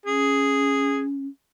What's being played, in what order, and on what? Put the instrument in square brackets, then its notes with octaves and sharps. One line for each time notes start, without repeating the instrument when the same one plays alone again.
[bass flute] C#4 [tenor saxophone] G#4